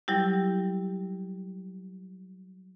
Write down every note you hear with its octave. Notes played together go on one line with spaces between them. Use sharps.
F#3 G3 E4 G4